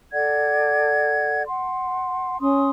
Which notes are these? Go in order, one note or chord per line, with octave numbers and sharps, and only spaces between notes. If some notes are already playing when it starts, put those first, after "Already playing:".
A4 D5 F#5 G#6
F#5 C6
C#4 C6 D#6